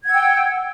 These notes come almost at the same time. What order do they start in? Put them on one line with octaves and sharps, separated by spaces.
G#6 F#5 E6 G5